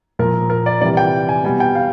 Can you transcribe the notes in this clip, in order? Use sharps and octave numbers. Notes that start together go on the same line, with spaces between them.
A#2 F3 A#4
A#4
D5
C3 E3 G3 D5
G5
G#5
B2 G3 G#5
G5
F5